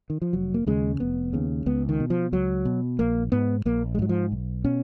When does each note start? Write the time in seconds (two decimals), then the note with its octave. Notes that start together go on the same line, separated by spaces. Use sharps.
0.10 D#3
0.22 F3
0.33 F1 F#3
0.54 A#3
0.66 D#2 C#3 G#3
1.00 F1 B3
1.33 D#2 C#3
1.66 C#2 B3
1.89 D#3
2.00 B2
2.10 F3
2.32 C#2 F#3
2.65 B2
2.99 A#1 A#3
3.32 G#2 B3
3.65 A#1 A#3
3.95 G#3
3.99 G#2 F#3
4.09 F3
4.32 B1
4.64 B2 C#4